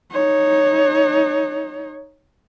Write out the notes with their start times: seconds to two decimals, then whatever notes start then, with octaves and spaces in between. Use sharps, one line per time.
0.11 D#4 C#5